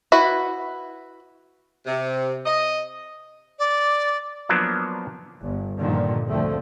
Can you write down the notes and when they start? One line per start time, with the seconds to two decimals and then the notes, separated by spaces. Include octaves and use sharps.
0.12 E4 F#4 B4
1.86 C3
2.46 D#5
3.59 D5
4.49 F3 F#3 A#3 B3 D4
5.42 G1
5.80 G2 A#2 D3 D#3 F3
6.29 D2 D3 F3 A3 C4